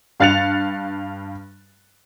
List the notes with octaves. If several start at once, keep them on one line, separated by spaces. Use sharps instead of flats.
G2 F5 F#6 A6 C#7 F7